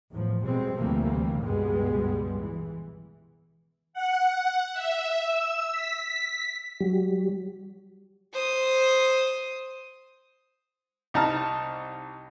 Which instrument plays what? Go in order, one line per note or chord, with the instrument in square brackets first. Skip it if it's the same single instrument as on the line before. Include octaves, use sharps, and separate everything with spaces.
[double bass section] E2 A2 F3
B2 G3 G#3 C4
D2 C3 E3 G3 A3 A#3
C#2 G2 B2 G3 G#3 B3
E3
[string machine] F#5
E5
E6
B6
[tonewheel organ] F#3 G3
[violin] C5 D#6
[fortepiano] C2 D#4 A5 A#5 F6